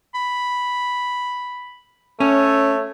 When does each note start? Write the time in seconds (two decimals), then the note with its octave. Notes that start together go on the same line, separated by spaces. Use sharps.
0.14 B5
2.20 A3 C#4 C#5